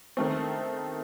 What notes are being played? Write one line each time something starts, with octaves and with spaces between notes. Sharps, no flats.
D#3 A3 C4